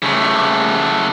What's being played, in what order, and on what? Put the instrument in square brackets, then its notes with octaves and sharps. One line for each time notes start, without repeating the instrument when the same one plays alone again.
[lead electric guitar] C#3 A3